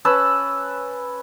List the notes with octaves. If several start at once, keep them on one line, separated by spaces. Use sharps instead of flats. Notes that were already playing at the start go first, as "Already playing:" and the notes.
C#4 B4 A5 E6